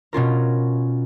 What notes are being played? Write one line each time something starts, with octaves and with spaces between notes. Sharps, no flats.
B2 C#4 F4 A#4